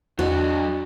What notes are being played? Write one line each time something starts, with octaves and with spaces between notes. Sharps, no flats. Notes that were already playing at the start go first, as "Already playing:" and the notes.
E2 F#3 D4 F#4 A4 D#5